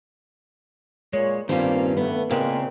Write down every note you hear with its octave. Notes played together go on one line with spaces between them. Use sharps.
A#2 G#3 C#5
G2 D#3 G3 A#3 C4 C#4 F4
A3 B3
A#2 C#3 G#3 A#3 C4 A#4 B4